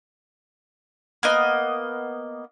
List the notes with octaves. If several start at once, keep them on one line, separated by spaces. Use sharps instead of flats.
A#3 B3 D#5